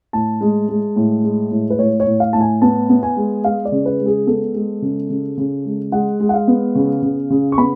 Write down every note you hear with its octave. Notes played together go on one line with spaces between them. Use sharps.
A2 A5
G#3
G#3
A2
G#3
A2
B4
A2 C#5
C#5
A2
F5
A2 A5
G#5
B3 A5
B3
G#5
G#3
G#3 F5
D5
C#3
B4
G#3
G#4
B3 A4
G#3
C#3
C#3
C#3
G#3
G#3 F#5
G#3
F#5
F5
B3
C#3
C#3
C#3
C#6
B3 B5